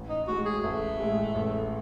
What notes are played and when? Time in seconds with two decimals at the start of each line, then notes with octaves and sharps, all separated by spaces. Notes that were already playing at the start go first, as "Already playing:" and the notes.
Already playing: A1
0.10 D#4
0.28 A2 G#3 F#4
0.46 G#4
0.63 A1 A3
1.00 A2 G#3
1.35 A1